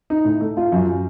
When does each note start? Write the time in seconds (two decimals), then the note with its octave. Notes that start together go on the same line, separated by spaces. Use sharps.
0.10 D#4
0.25 A2
0.41 A3
0.57 F4
0.72 F#2